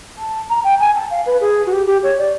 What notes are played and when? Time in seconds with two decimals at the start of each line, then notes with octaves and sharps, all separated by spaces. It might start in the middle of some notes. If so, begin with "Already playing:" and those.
0.18 A5
0.49 A#5
0.63 G5
0.79 G#5
0.95 A5
1.10 F5
1.25 B4
1.40 G#4
1.66 F#4
1.72 G4
1.86 G4
2.02 C#5
2.18 D5